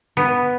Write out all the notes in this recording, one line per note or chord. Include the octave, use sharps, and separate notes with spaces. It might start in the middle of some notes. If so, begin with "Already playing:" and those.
B3